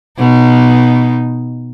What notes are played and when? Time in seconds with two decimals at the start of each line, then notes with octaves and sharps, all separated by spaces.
0.18 B2 D#4